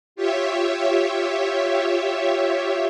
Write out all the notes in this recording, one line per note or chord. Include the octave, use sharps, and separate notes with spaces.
F4 G4 C#5 E5